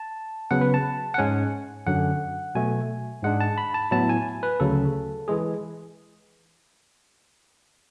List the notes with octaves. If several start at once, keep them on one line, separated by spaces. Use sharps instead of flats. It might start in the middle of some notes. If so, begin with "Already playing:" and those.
Already playing: A5
C#3 F#3 B3 F#5
B4
A5
F#5
G#2 G#3 C#4 G#5
F#2 D3 F#3 F#5
B2 F#3 A3 G#5
G#2 G#3 D4 F#5
A5
B5
A5
A2 F#3 B3 E4 A5
G#5
B4
D2 C#3 F#3 A4
E3 G#3 G#4